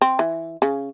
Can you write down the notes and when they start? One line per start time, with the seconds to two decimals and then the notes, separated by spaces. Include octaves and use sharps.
0.02 C4
0.19 E3
0.62 C#3